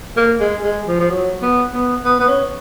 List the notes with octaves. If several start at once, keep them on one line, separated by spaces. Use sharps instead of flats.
A#3
G#3
G#3
F3
F3
F#3
B3
B3
B3
B3
C#4